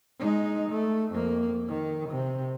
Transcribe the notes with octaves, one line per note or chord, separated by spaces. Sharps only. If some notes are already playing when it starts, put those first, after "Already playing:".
G#3 D#4
A3
F2 A#3
D#3
C3